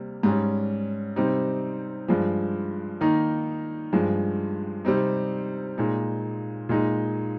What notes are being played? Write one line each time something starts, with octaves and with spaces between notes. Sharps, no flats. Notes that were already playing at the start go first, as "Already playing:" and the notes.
Already playing: C3 G3 A#3
G#2 G3 C#4
C3 G3 C4 D#4
G2 F3 G#3
D#3 A#3 D#4
G2 F3 G#3
C3 G3 C4 D#4
A#2 G#3 D#4
A#2 G#3 D#4